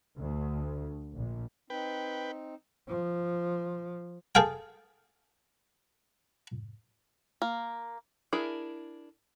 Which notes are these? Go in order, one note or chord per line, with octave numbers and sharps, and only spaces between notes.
D2
A#1
C4 D#4 B4 G5
F3
G#4 A4 F5 G5
A#3
D4 E4 G#4 A#4